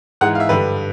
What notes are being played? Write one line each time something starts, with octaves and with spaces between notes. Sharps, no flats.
G#2 E3 G#3 F#5
F5
E5
G2 D3 G3 B4